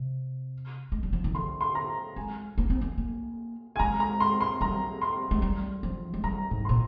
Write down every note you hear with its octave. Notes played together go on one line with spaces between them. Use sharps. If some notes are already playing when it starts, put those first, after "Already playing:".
Already playing: C3
G#3
G3
F3
D#3
D3 C6
C6
A#5
G#3 G#5
A#3
C4
A#3
A#3
G#5
G#3 A#5
A#5
C6
C6
G3 A#5
C6
G#3
G3
F3
G#3
G3 A#5
G#2
A#2 C6